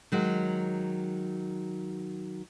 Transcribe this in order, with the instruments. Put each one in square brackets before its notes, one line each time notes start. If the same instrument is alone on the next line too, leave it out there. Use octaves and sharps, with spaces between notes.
[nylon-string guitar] D#3 F#3 G#3